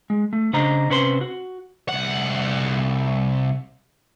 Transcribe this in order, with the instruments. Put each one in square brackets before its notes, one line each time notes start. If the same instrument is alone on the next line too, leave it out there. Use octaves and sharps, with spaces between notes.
[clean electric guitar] G#3
A3
C#3 D4 C5 D#5 A#5
C3 C#4 B4 C5 C6
F#4
[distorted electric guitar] C2 F#5